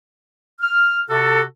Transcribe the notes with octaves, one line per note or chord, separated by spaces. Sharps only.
F6
C3 F#4 A4